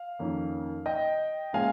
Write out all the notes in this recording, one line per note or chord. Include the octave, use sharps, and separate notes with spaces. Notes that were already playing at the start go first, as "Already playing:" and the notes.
Already playing: F5
F2 D#3 A#3 C#4
D#5 G5
A#2 G#3 C#4 F5 G#5